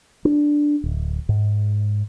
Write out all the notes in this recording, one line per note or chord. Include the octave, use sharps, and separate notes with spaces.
D4
D1
G#2